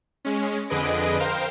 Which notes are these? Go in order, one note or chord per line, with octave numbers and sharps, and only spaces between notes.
G#3 C#4
F2 D3 G#4 B4 D#5 D7
A#4 C5 F5 G5